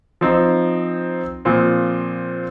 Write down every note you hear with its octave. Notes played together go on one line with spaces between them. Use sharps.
F3 C4 D#4
A#2 F3 C4